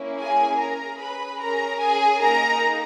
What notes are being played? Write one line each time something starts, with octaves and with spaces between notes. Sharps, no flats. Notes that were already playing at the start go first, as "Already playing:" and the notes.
Already playing: A#3 C#4 E4
G#4 G#5
C#4 G#4 A#4 A#5
B4 B5
C#4 G#4 A#4 A#5
G#4 G#5
A#3 D#4 G#4 A#4 A#5